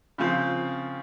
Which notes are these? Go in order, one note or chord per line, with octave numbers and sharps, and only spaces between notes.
C#3 F3 C4